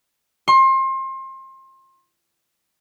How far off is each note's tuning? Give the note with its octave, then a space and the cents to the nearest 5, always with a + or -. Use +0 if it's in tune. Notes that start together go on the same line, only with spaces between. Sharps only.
C6 +30